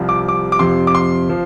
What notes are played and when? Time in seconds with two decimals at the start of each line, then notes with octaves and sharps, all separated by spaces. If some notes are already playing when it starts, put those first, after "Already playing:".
Already playing: C2 C3 F3
0.09 D6
0.28 D6
0.52 D6
0.59 F2 C3 F3 C6
0.87 D6
0.95 C6
1.29 F3